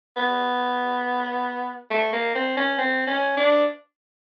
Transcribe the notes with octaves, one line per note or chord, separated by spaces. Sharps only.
B3
A3
A#3
C4
C#4
C4
C#4
D4